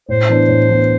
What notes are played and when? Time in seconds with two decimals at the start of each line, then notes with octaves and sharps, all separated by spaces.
0.09 A2 C5
0.29 E3 B3 D4
0.48 A2
0.69 E3 B3 D4